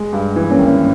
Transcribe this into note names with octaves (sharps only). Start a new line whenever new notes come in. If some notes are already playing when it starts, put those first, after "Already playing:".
Already playing: G#3
G2
E3
A#3 C#4
G#1